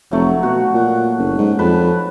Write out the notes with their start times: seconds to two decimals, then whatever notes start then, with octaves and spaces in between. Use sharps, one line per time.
0.11 F1 F#3 A3
0.43 B2 F#4
0.74 A#2
1.18 F#1
1.38 G#2
1.59 F2 B4 A5